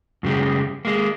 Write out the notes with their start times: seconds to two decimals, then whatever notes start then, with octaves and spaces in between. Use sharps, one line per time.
0.23 F#2 C#3 G3 G#3
0.85 G#3 A#3